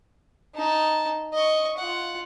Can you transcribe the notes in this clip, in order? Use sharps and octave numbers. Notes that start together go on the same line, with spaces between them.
D#4 A5
D#5 C#6
F4 F#5